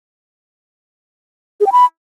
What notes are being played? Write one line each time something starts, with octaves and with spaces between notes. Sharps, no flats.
G#4
G5
B5